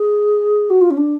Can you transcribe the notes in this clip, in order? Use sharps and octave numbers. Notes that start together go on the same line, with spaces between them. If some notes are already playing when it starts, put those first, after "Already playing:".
Already playing: G#4
F#4
F4
C#4
D4